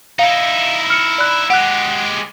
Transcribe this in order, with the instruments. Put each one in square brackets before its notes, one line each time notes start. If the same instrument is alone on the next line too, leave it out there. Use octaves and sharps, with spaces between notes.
[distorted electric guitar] D#4 E4 [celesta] F5
[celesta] F6 C#7
D5 B5 F#6
[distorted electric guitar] G#3 G4 [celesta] F#5 F#6